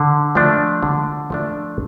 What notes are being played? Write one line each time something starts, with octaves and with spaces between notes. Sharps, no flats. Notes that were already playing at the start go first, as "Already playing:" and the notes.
Already playing: D3
F3 A3 D4
D3
F3 A3 D4